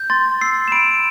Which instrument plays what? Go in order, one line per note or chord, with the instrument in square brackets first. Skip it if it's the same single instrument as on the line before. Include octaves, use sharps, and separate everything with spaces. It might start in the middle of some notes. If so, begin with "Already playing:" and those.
Already playing: [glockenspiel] G6
C6 A6
E6 C7
E7
B5 D7